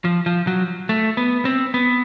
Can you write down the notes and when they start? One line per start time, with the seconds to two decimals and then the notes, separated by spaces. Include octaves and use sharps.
0.05 F3
0.26 F3
0.47 F#3
0.89 A3
1.17 B3
1.45 C4
1.74 B3